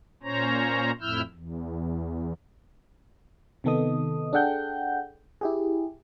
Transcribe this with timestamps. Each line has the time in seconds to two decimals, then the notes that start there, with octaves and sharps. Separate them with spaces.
0.23 A#2 C#4 C5 C#5 A#5
1.01 F2 A2 E4 E6 F6 G6
1.34 E2
3.64 C3 D#3 B3 A4 D#5 D#6
4.33 D4 G#4 A4 F#5 G5 G6
5.41 E4 G4 G#4